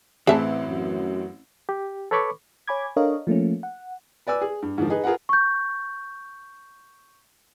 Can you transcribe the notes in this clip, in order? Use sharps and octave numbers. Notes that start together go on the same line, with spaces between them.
A1 A2 E3 C4 G#4 E5 A5
F#2
G4
A4 B4 C#5 B5 C#6 D6
C#5 G#5 B5 D6 G#6
D4 A4 A#4 C#5 D#5 F5
F3 A3 A#3 C#4
F#5
B4 D5 G#5 E6
G#4
G2
G#2 D3 D#3 F3
D#4 G#4 B4
F4 G#4 A#4 B4 F#5
C#6 G6